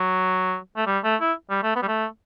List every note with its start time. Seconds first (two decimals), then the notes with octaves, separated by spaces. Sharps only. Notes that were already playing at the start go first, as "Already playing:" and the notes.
Already playing: F#3
0.76 A3
0.87 G3
1.04 A3
1.21 E4
1.50 G3
1.63 A3
1.76 B3
1.83 G3
1.88 A3